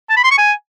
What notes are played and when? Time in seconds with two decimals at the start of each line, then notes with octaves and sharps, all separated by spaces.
0.10 A5
0.17 B5
0.24 C6
0.31 C#6
0.38 G#5